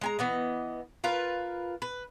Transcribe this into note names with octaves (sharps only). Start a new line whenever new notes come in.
G#3 G#5 A#5
E3 B3 D#5
F4 A#4 B4 F5
B4